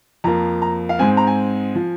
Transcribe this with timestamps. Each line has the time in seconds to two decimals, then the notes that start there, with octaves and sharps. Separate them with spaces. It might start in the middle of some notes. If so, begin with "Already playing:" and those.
0.24 F2 F3 A#3 A#5
0.62 A#5
0.89 F5
0.99 G#2 G#3 C4 G#5
1.17 A#5
1.27 G#5
1.75 F3